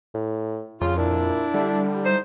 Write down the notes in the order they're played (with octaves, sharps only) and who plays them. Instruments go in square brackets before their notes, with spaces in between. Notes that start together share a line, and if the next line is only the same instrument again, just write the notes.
[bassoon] A2
[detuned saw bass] F2 [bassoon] C#3 [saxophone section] F4
[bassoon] A#2 [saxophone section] D4 E4
[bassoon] D3 [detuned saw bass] G3
[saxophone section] D#4 E4 C5